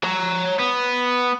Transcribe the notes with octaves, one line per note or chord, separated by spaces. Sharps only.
C#5 A#5
B3